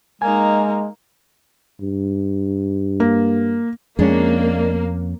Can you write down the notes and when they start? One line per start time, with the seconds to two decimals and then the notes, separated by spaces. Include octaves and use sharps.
0.22 G#3 A#3 D#4 G#5
1.81 G2
3.00 A#3
3.99 F2 G#3 A#3 C#4 D4